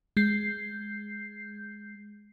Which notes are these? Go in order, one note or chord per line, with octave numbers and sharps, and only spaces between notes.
G#3 G6 C7